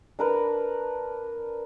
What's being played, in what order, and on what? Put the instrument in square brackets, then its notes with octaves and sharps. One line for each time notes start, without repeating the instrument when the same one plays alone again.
[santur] D4 A#4 B4